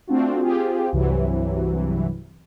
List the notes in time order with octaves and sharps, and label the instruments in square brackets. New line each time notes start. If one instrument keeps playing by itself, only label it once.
[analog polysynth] A3 C4 D4 F4 F#4
C4 F4 G4 G#4
C2 G2 C3 E3 F#3